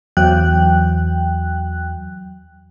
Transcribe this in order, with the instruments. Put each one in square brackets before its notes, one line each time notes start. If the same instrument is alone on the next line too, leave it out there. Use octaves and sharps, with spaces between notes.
[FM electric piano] E2 F#3 G5 F#6